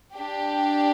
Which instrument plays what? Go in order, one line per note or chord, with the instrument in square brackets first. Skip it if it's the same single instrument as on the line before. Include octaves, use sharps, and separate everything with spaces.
[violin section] D4 G4